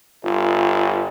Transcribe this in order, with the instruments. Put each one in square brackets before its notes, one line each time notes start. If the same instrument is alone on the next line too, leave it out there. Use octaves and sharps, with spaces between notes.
[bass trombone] G1 [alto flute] F4